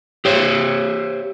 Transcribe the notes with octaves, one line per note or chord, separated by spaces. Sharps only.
G4 C5 C#5